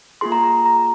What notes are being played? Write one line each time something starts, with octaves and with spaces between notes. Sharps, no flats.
A#3 F4 G#4 C6
A#5
A#5
A#5